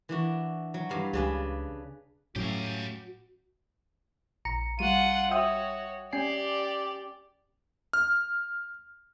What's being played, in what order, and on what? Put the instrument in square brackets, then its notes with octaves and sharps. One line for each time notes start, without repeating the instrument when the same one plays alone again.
[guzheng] E3 D4 F#4
F#3
G2 F5 B5
[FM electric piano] C#2 G4 G#5 [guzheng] C#3 D4 B4
[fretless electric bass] A2 F#3 [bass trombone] C#4 [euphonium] F#4 [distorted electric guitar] G4 F5
[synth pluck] A#1 A#5 C#7
[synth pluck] G3 D#7 [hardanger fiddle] F4 F#5
[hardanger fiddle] F#4 C#5 [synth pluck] E5 G5 D#6
[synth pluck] C#4 G#5 C7 [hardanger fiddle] G4 D5
[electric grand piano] F6